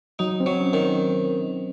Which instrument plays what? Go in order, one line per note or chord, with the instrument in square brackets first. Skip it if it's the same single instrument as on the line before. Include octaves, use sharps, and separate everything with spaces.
[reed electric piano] F#3 [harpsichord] D#4
[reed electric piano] C4
[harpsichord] F#3
[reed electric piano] C#4
[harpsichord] D#3
[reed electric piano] C4